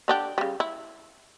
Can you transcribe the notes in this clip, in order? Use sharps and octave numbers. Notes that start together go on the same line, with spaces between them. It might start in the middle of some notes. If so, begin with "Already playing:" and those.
D3 D4 G4
C#3 G3
E4